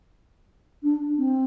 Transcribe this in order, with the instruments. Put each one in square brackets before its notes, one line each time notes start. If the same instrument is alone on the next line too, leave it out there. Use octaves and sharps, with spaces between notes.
[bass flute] D4
C4